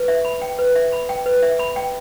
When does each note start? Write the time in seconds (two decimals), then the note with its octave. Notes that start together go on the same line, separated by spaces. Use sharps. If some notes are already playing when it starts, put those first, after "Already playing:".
Already playing: B4
0.08 E5
0.25 B5
0.42 G5
0.58 B4
0.75 E5
0.92 B5
1.09 G5
1.26 B4
1.42 E5
1.59 B5
1.76 G5